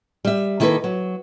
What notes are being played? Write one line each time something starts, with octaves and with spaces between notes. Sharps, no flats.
G3 E5
D#3 A#3 E4 A4 B4
F#3